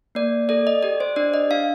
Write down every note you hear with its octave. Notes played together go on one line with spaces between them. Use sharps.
A#3 D5
A4 D5
D#5
G4 D5
C5
D4 D5
D#5
D4 F5